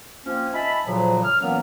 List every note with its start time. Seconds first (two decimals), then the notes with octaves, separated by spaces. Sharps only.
0.25 F3 A#3 C4 C#4
0.53 D#4 E5 G#5 A5 B5
0.86 D2 A#2 C#3 F3 F#3
1.24 F6
1.41 A#2 E3 F#3 A#3 B3 C#4